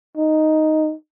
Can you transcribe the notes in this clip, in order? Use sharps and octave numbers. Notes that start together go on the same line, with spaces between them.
D#4